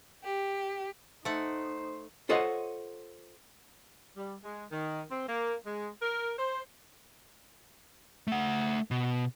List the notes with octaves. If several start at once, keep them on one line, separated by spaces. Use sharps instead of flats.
G4
A3 D#4 C5 F#5
F4 A4 C5 C#5 D#5 F#5
G3
G#3
D#3
C4
A#3
G#3
A#4
C5
A3 F#5
B2